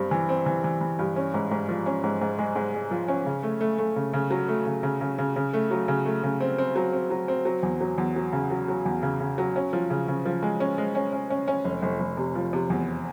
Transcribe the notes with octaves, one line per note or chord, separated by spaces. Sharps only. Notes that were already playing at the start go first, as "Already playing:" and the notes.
Already playing: G2 C4
E3
C4
E3
E3
E3
G2
C#4
G#2
G#2
F3
C#4
G#2
G#2
G#3
G#2
G#3
F3
C#4
C#3
A3
A3
A3
C#3
C#3
F#3
A3
C#3
C#3
C#3
C#3
C#3
A3
F#3
C#3
A3
C#3
C4
C4
F#3
C4
F#3
C4
F#3
E2
F#3
E2
F#3
C#3
F#3
F#3
E2
C#3
C#3
F#3
C#4
F3
C#3
C#3
F3
G#3
C#4
G#3
C#4
C#4
C#4
C#4
F1
F1
F1
C3
F3
C3
E2